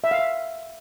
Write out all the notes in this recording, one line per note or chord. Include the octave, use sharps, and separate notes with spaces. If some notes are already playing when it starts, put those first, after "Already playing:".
E5
F5
E5